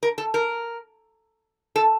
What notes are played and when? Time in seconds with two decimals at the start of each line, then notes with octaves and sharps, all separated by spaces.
0.03 A#4
0.18 A4
0.34 A#4
1.76 A4